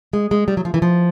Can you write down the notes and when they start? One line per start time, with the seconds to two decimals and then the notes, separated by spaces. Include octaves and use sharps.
0.13 G#3
0.31 G#3
0.48 G3
0.57 F#3
0.65 F3
0.74 E3
0.82 F3